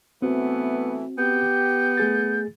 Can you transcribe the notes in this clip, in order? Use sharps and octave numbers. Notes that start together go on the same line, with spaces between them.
E3 A3 B3 C4 F#4
B3 G4 G6
A3 G#4 A6